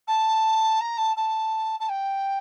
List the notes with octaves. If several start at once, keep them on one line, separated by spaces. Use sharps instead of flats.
A5
A#5
A5
A5
A5
G5